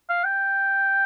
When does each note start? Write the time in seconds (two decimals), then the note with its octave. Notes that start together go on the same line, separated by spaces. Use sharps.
0.10 F5
0.24 G5